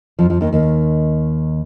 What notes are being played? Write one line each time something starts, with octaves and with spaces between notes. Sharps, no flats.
F2 F3
F2 F3
D#2 D#3
D#2 D#3